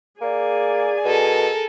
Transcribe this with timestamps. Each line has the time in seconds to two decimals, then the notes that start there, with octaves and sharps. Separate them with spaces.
0.21 A#3 G#4 D5 G#5
1.05 B2 A4 A#4